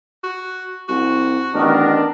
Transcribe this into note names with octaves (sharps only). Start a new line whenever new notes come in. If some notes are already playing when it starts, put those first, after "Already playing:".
F#4
C2 F#4
A1 D#3 B3 D4 A#4